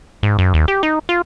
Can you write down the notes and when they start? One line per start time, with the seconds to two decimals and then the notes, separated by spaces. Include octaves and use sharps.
0.23 G#2
0.39 F#2
0.54 D#2
0.68 G4
0.83 D#4
1.09 F4